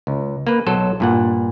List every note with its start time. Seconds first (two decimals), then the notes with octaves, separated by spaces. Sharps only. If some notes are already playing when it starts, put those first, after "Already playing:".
0.07 C#2
0.47 A#3 B4
0.67 B1 F#3 A4 C5
1.00 G2 A#2 F#5